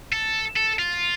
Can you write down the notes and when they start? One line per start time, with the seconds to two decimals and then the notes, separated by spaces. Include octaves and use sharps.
0.13 A4
0.56 A4
0.79 F4